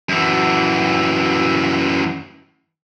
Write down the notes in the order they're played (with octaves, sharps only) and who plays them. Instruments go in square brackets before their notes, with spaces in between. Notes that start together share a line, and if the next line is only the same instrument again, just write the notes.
[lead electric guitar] F#2 E3